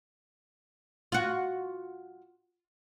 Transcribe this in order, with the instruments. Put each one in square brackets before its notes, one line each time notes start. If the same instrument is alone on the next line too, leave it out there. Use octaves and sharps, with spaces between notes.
[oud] F4 F#4